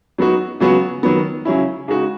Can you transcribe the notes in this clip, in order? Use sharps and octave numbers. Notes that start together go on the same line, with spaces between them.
F#3 B3 D#4 F#4
C#3 F#3 B3 F#4
D#3 F#3 B3
C#3 F#3 C#4 E4
C#3 G#3 D#4 F#4